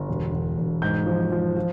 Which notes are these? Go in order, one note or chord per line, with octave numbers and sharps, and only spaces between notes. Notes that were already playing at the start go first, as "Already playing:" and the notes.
Already playing: G1
E1
E1
E1
G#2 G6
F3
F3
F3